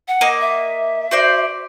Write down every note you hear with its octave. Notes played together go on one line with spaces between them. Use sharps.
F#5
A#3 D#5
E5
F#4 C5 D5